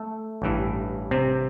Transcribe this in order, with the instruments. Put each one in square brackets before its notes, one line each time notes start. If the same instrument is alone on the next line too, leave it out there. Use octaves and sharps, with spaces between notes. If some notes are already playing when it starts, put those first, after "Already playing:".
Already playing: [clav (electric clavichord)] A3 A4
A1 G2 E3
C3 C4